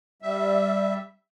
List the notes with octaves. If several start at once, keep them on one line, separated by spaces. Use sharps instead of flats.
G3 E5